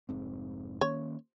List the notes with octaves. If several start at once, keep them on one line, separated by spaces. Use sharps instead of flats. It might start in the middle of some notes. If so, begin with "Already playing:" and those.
F1 G#2 C4
D#3 A#3 C#4 C#5